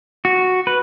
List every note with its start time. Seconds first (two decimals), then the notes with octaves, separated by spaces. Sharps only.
0.25 F#4
0.67 B4